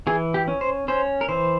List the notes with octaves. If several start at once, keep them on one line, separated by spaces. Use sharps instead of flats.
E3 G#4
G4
C#4
C5
C#4 C5
A#4
E3 C5